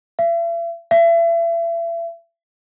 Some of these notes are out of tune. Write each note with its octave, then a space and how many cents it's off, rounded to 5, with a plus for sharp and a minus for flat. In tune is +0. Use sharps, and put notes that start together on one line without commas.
E5 +45
E5 +35